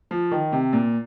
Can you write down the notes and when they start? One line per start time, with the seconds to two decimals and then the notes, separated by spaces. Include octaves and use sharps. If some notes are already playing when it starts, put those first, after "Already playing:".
0.11 F3
0.31 D#3
0.52 C3
0.73 A#2